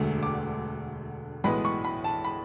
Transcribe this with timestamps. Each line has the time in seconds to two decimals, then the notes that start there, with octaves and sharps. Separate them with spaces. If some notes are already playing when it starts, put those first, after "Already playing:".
Already playing: E1 D2 D3 A3
0.23 D6
1.44 B1 A2 E3 G#3 B3 B5
1.65 C#6
1.85 B5
2.04 A5
2.25 B5